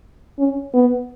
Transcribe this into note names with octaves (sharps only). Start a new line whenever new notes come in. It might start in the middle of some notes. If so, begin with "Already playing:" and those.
C#4
B3